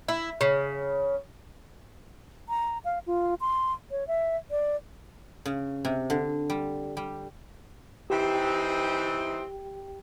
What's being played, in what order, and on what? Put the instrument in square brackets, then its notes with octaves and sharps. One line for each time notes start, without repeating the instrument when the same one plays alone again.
[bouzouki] E4
C#3
[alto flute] A#5
F5
F4
C6
C#5
E5
D5
[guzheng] C#3
C3
D3
G3
G3
[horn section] E3 C4 D#4 [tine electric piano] G4 G5